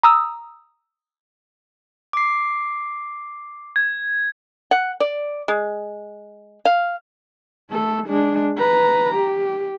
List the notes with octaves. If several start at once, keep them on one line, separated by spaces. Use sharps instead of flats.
A#5 D#6 E6
D6 C7
G#6
F#5
D5
G#3
F5
A3 A4
G#3 D4
B4 A#5
G4